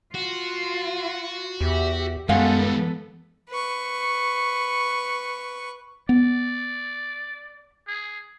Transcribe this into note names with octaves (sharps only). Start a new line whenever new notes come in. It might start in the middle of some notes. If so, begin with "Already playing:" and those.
F4 F#4
E2 G4 E5
F#2 D#3 G3 G#3 B3 A4 F5 F#5
B4 C#6
B3 D5
G#4